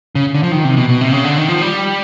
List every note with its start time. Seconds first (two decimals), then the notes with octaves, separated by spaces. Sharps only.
0.15 C#3
0.34 D3
0.43 F3
0.52 D#3
0.64 C3
0.77 B2
0.89 B2
1.01 C3
1.12 C#3
1.24 D3
1.37 D#3
1.49 F3
1.62 G3